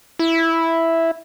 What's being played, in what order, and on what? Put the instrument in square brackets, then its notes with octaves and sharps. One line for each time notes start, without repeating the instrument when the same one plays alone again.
[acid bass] E4